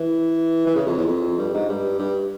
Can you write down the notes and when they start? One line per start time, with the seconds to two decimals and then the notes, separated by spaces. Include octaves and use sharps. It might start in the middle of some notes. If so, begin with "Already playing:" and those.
Already playing: E3
0.66 E3
0.75 C#3
0.86 F2
0.97 E2
1.07 F2
1.38 G2
1.54 G#2
1.69 G2
1.99 G2